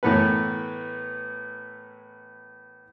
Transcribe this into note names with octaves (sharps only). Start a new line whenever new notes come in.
A2 E3 B3 A#4 B4